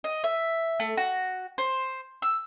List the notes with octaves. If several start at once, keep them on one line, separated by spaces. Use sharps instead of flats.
D#5
E5
A3
F#4
C5
E6